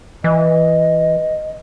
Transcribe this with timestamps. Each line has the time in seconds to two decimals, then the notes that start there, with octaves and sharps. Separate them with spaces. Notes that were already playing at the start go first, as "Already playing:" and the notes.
0.24 E3 D#5